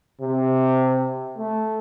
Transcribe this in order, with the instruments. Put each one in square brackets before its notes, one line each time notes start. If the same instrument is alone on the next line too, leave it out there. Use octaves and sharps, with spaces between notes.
[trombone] C3
A3